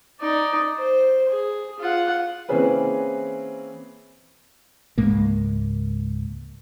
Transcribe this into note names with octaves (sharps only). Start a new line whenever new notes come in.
D#4 D5
C5
G#4
F4 F#5
E3 A#3 C4 C#4 G#4 B4
C#2 G#2 G#3 A#3